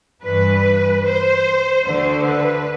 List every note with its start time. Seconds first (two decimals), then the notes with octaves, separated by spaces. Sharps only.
0.23 G2 E3 B4
1.04 C5
1.85 D2 D3 C5
2.25 B4